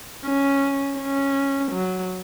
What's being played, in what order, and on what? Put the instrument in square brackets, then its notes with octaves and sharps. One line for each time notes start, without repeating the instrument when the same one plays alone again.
[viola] C#4
C#4
F#3